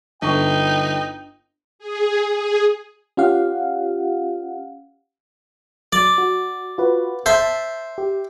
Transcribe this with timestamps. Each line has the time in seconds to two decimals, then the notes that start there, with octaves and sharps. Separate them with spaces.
0.22 G1 D4 D#4 G5 C#6
1.79 G#4
2.35 G#4
3.17 C#4 F4 G4 F5 F#5
5.93 F#3 D5
6.18 F#4
6.78 F4 F#4 B4
7.26 C5 E5 A5
7.98 G4